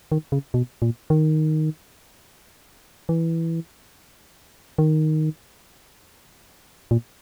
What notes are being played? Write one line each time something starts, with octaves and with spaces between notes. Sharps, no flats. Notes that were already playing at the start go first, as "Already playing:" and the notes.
D#3
C#3
B2
A#2
D#3
E3
D#3
A#2